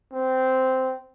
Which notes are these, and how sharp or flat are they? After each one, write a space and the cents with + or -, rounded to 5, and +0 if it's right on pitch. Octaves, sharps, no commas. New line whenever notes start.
C4 -10